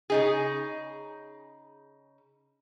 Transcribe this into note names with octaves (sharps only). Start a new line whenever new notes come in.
C#3 D#4 G#4